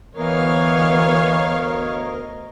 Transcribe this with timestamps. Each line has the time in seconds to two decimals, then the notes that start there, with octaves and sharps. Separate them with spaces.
0.16 D2 E3 B3 A#4 C#5 D#5 F5